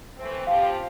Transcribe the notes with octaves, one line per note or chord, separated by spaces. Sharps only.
E3 A3 C4
F3 C4 G4 F5